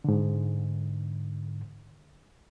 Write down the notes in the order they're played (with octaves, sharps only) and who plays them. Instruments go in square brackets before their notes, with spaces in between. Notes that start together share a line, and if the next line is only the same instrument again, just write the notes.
[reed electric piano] G#2 D3